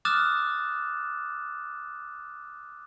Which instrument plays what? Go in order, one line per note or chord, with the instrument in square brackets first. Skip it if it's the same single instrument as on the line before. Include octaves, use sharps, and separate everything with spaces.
[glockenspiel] D6 D#6 F6 F#6 A6 E7